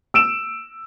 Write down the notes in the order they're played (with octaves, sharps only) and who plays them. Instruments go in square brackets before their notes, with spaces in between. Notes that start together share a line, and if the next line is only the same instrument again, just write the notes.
[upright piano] E6 D7 E7